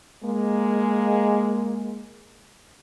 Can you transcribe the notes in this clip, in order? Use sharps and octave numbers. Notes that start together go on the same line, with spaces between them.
G#3 A#3